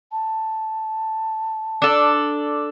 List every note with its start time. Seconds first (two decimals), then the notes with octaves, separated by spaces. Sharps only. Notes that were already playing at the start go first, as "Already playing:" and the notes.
0.12 A5
1.82 D4 A4